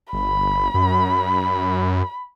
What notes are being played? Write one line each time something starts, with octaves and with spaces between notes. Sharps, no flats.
G1 B5
F#2